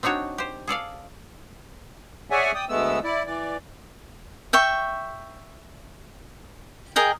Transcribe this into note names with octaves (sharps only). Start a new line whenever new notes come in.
C4 D4 D#4 F#4 C#5
G4 C5
G#4 A4 D5 F5
G#4 C#5 D5 E5 F#5 G#5
D5 G5 D#6
D2 G#3 A3 B3 E6
E4 D5
E3 D5
E5 G5 C#6
G#4 A#4 D#5 G5